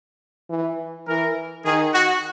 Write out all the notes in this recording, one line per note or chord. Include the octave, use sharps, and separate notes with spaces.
E3
E3 A#4
D#3 G#4
F#4